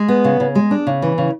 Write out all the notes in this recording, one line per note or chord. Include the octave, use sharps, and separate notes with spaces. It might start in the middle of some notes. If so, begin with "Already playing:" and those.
Already playing: G#3
B3
C#3
C#3
G#3
D4
C#3
E3
C#3